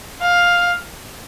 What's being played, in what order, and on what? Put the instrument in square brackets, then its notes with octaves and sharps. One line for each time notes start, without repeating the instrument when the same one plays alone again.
[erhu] F5